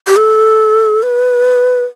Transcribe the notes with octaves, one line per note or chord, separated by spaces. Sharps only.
G4
A4
B4